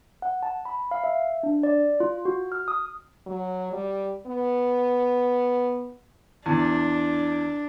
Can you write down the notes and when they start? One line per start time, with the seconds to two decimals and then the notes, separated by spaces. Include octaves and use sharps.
0.22 F#5
0.43 A5
0.65 B5
0.91 F5
1.04 E5
1.43 D4
1.63 D5
2.00 F4
2.25 F#4
2.52 F6
2.68 D#6
3.27 F#3
3.72 G3
4.27 B3
6.46 E2 D4